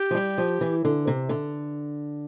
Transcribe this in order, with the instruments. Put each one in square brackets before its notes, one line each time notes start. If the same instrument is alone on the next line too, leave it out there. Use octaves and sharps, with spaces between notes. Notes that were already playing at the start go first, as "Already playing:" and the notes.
Already playing: [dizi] G4
[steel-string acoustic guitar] F3
G3
F3
E3
D3
C3
D3